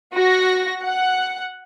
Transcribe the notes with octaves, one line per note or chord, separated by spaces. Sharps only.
F#4 A#6
F#5